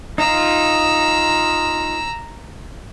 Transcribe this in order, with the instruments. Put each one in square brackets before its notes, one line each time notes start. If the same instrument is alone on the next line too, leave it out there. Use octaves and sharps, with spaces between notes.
[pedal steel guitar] D#4 F4 [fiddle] A#5 E6